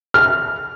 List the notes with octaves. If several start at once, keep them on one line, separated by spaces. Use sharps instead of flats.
F6